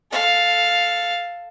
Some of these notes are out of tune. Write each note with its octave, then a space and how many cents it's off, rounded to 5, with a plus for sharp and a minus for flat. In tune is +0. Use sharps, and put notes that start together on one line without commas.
A4 +0 F5 +0